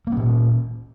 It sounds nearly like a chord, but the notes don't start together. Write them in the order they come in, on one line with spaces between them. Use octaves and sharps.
A#3 C#4 A#2